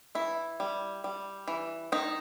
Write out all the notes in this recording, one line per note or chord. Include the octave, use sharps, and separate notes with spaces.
E3 E4
G3
G3
E3
D#3 D#4